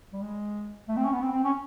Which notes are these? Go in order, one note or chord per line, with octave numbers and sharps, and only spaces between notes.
G3
G#3
A3
C4
C#4
B3
C4
C4
C#4